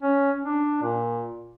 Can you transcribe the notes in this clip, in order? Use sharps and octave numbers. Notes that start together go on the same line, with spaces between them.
C#4
D4
A#2